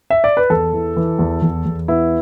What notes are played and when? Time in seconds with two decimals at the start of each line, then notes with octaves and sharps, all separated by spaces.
0.10 E5
0.24 D5
0.37 B4
0.50 E2 A4
0.73 E3
0.96 E3
1.19 E2
1.42 E2
1.66 E2
1.88 B3 E4